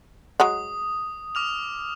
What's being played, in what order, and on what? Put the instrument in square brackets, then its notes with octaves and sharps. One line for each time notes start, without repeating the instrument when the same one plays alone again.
[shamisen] F#3 G#3 F#5 [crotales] D#6
[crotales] D6 F6 F7